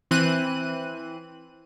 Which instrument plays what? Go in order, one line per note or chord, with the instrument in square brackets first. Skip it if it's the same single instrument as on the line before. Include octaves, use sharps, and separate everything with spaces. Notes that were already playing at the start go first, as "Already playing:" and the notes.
[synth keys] E3 C4 F#6 D#7